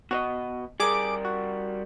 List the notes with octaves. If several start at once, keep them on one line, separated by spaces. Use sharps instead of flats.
B2 F#4 C#5 D#5
G3 G#4 A#4 D6 D7
F#4